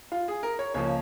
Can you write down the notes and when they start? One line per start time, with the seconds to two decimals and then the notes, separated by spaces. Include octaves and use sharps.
0.12 F4
0.28 G#4
0.43 A#4
0.59 C#5
0.74 C#2 C#3 F3 A#3 C#5